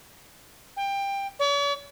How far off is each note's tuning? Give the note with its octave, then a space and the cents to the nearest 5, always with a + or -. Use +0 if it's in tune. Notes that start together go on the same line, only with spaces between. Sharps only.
G5 +20
C#5 +45